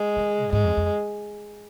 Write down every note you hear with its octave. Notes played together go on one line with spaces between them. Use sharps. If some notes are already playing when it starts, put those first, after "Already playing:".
Already playing: G#3
D#3
F2
G#2 G#3
F2
F2